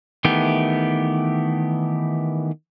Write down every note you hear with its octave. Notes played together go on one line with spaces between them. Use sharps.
D#3 E3 A3 B3 G4